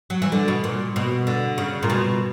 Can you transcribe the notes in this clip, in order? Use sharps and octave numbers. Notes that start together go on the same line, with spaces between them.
F#3
E3
D3
B2
A#2
B2
D3
C#3
A#2
B2